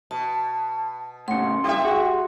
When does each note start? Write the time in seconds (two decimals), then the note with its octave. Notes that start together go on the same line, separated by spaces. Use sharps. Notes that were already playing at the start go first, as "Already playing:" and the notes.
0.11 B2 A5
1.28 A2 C#3 F#5 C6 C#7
1.64 G2 E4 F4 G4 E5
1.85 F#4 G#4